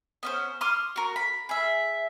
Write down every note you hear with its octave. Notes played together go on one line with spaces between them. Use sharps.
B3 C#4 C5
C6 D6 D#6 F6
F#4 A#4
B5
G#4 E5